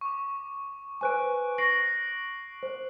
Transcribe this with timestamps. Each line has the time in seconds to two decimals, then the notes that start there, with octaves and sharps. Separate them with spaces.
0.01 C#6 D6
1.01 B4 C5 G#5 C#6 F#6 D7
1.58 C#6 A#6 C7 D7 F#7
2.63 C5